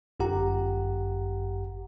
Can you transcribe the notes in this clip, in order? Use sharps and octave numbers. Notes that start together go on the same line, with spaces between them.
G1 F#2 G4 F#5 A#5